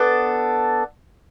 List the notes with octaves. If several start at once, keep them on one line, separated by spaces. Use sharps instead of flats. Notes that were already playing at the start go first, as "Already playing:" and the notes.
Already playing: B3 D4 A4